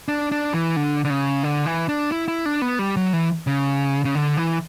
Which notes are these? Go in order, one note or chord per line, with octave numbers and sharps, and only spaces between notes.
D4
D4
E3
D3
D3
C#3
D3
E3
D4
E4
E4
D4
B3
G3
F#3
E3
C#3
C#3
D3
E3